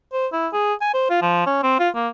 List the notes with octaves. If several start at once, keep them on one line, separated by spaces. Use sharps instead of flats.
C5
E4
G#4
G#5
C5
F4
F3
C#4
C4
F4
A#3